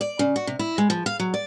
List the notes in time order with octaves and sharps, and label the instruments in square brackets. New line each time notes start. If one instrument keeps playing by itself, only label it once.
[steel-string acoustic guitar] D5
C#3
F#4
C3
E4
G#3
F3
F5
F#3
D5